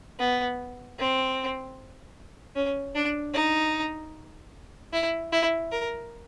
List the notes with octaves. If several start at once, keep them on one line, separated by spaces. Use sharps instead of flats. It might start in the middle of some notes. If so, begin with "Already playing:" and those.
B3
C4
C#4
D4
D#4
E4
E4
A#4